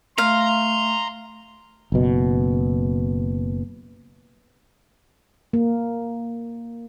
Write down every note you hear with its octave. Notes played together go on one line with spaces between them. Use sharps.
A3 F5 A#5 C6
F#1 B2
A#3